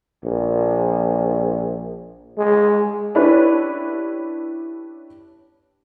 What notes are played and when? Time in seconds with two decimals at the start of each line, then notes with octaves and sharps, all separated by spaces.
0.24 A#1
2.38 G#3
3.15 C#4 D4 E4 G4 B4 C#5